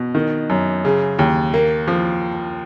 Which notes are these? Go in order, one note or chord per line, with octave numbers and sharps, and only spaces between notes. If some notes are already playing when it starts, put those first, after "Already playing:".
Already playing: B2
D#3
F#2
C#3
D#2
A#3
F3